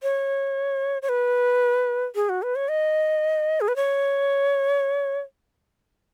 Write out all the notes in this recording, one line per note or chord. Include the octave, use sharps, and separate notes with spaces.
C#5
C#5
B4
G#4
F#4
B4
C#5
D#5
G#4
B4
C#5